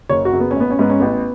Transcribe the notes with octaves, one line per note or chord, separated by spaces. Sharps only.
F#1 C#5
F#4
F#2 C#3
B3
C#4
A1 B3
C#4
G#2 B3
C#4
A1 B3